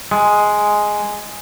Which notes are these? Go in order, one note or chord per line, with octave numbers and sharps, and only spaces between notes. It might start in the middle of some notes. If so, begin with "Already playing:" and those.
G#3